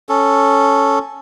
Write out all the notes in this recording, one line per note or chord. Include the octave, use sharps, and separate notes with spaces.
C#4 A4